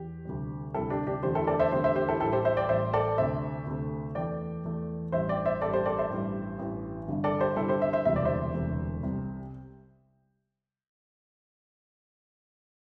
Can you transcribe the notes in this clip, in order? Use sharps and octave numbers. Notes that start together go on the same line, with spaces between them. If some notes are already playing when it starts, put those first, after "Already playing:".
Already playing: E2 G4
D2 C3 G3
D2 C3 G3 E4 A4
D4 G4
D4 G4
E2 D3 A3 G4 C5
E4 A4
A4 D5
C5 E5
E2 D3 A3 G4 C5
C5 E5
G4 C5
E4 A4
A1 A2 G3 E4 A4
G4 C5
C5 E5
D5 G5
A1 A2 G3 C5 E5
A4 D5
D2 C3 A3 C5 E5
D2 C3 A3
E2 E3 A3 D5 G5
E2 E3 A3
A1 G2 G3 C5 E5
D5 G5
C5 E5
A1 G2 G3 A4 D5
G4 C5
A4 D5
C5 E5
A1 G2 E3 G3
A1 G2 E3 G3
G1 G2 D3
A4 D5
G4 C5
G1 G2 D3 E4 A4
G4 C5
C5 E5
C5 E5
E1 D2 C3 E3 G3 E5
D5
C5 E5
E1 D2 C3 E3 G3
C2 C3 G3